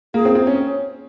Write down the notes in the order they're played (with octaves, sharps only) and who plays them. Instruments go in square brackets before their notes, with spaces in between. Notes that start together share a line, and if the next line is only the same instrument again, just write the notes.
[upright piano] A#3 [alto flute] G#4
[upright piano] C4
C4
C#4